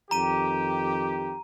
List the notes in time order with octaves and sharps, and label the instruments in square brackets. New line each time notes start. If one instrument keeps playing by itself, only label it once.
[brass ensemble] F2 D#3 G4 [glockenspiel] A#5 D#7